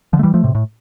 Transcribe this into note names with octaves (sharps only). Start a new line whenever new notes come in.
D3 F3
A3
E3 G3
F3 A3
A2 C3
A2